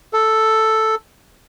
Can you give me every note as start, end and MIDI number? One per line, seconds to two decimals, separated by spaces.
0.13 0.95 69